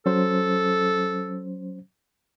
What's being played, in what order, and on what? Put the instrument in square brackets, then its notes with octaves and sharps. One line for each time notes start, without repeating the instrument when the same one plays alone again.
[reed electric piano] F#3 C#4 C5 [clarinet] A4